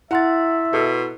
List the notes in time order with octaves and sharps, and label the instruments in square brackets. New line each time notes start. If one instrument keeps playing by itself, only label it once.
[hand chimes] E4 C6 A6 [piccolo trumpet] E5 [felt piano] F#5
[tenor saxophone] B2 [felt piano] A4